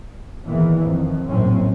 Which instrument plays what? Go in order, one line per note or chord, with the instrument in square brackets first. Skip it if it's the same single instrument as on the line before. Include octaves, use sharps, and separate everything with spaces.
[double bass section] E2 A#2 D#3 E3
F2 D#3
A#1 F#2 A2 F#3 C4 C#4